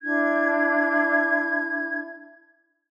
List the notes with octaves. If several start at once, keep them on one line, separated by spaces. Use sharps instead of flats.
D4 E4 G#6